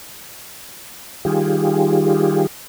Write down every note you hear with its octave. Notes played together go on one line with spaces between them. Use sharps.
D#3 G3 F4 G4 G#4